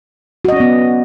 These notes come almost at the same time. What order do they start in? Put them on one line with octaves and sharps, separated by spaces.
F#4 D#5 C#4 D5 B3